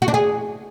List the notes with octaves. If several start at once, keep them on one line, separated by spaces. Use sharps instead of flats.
F#4
D4
G#4